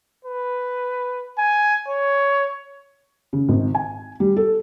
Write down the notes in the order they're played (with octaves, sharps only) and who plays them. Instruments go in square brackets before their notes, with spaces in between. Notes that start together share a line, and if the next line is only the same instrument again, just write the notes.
[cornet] B4
G#5
C#5
[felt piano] C#3
G#1
G#5
G3
A4